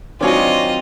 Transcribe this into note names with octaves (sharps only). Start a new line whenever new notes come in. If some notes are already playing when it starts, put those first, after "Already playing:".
D#3 F#3 C4 D4 F4 C#5 D#5 G#5